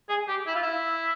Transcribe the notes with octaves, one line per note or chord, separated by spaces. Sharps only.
G#4
G4
E4
F4
E4